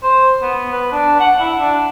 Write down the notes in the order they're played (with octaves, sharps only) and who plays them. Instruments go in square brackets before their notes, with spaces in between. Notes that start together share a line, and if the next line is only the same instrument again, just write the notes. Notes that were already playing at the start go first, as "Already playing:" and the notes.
[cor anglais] C5
B3
B4
D4
F#5
E4
D4